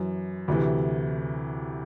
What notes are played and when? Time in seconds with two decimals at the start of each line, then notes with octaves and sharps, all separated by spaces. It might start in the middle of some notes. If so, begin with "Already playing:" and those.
Already playing: F#2 E3
0.48 D2 C3 E3